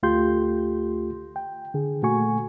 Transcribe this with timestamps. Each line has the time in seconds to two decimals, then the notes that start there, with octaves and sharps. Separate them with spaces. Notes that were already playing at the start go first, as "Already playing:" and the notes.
0.03 D2 A3 F4 G4 C6 G6
1.36 G5
1.74 D3 G#4
2.02 A#2 A3 F#4 G#5 C#6